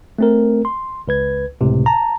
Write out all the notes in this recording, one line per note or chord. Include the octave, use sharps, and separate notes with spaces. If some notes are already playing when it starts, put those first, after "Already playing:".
A3 C4 A#4
C6
C#2 B4 G#6
C#2 A2 C3
A5 A#5